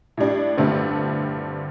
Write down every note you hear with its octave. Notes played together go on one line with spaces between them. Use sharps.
A2 G3 D4
G2 D3 A3 C4